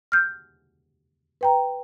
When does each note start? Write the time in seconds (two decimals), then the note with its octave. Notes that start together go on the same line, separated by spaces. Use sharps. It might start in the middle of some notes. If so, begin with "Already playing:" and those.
0.12 F6 G6
1.41 B4 G5 A#5